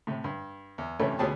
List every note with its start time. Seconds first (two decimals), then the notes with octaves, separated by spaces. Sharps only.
0.07 A2 C3
0.24 G2
0.78 E2
1.00 G2 C3 E3 G3 A3 C#4
1.19 D2 B2 C#4 G4 G#4 A5